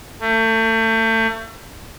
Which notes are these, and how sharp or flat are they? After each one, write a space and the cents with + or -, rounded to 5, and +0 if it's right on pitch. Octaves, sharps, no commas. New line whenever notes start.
A3 +35